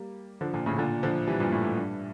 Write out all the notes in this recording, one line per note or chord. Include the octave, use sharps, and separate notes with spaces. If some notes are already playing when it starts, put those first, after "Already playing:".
Already playing: G3 A#3
D3 F3
A#2 D3
A2 C#3
A#2 D3
D3 F3
E3 G3
G2 A#2
A2
A2
G2